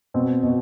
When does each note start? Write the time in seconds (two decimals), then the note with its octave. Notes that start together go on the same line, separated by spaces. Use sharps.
0.14 B2 C4
0.43 B2